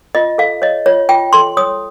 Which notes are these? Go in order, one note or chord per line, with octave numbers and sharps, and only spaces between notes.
F4 D#5
A4 F5
C#5 D#5
F4 C#5
F4 G5
A4 C6
C#5 D#6